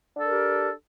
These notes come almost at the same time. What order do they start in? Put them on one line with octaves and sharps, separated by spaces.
D4 A4 A#4 G4